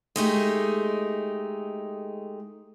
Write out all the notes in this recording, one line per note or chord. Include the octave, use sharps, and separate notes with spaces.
G#3 A3 D#4 G4